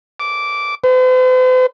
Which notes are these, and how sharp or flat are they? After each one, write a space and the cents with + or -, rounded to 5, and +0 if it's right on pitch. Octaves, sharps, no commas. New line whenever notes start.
D6 -10
C5 -45